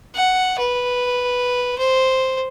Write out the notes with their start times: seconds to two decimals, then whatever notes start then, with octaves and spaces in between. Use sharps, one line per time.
0.15 F#5
0.59 B4
1.78 C5